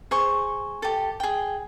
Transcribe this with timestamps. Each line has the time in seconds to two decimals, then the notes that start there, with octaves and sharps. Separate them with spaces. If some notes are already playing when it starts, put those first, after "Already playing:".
0.11 G#4 C5 C#6
0.82 G4 A4
1.20 G#4 G5